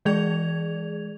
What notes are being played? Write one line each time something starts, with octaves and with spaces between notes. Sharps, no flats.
E3 G#3 G#4 D5 G#6 F7